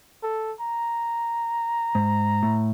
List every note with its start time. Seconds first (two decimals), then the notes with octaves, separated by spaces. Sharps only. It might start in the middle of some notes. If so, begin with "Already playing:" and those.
0.23 A4
0.61 A#5
1.95 G#2
2.43 A2